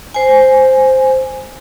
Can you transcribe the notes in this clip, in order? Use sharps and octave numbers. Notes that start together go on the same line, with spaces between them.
C5 G#5